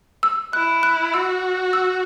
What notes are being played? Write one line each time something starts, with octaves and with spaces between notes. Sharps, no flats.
E6
E4 F#6
F#6
F#4 E6
E6